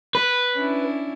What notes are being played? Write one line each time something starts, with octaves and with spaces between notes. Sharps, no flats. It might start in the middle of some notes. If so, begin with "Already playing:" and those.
B4
C#4 D4 E4